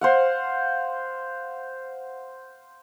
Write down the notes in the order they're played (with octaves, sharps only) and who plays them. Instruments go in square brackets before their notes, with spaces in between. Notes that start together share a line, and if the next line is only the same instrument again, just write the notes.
[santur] C5 F5 F#5